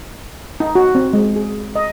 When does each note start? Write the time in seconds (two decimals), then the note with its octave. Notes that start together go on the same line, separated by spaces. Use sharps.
0.60 D#4
0.75 F#4
0.95 C4
1.13 G#3
1.36 G#4
1.76 D#5